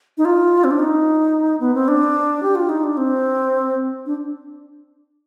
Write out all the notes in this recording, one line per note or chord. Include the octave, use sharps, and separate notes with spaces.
D#4
F4
C4
D4
D#4
B3
C4
D4
G4
F4
D#4
D4
C4
D4